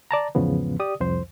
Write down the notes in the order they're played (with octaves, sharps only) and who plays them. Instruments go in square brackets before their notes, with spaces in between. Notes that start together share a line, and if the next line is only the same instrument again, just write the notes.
[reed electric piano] D5 A5 A#5
E2 G#2 C#3 F3 B3
G4 D5 D#6
C2 F2 C5